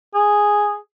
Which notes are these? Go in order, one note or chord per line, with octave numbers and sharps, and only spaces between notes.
G#4